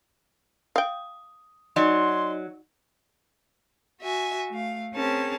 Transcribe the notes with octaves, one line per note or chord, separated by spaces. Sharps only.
F5 G5 D#6
F#3 D#4 D5 D#5 C6
F#4 E5 G#5
A3 F5
C4 C#4 G#4 A#4 A5